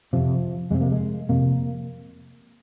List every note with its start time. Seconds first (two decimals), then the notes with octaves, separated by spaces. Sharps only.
0.13 F2 C3 F3
0.70 F2 C3 G#3
0.81 A#3
0.92 G#3
1.29 F2 C3 A#3